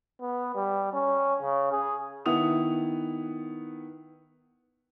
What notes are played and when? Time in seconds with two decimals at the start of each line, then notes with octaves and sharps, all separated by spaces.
0.21 B3
0.55 G3
0.93 C#4
1.41 C#3
1.72 G#4
2.26 D#3 B3 E4 F#5 D#6 F7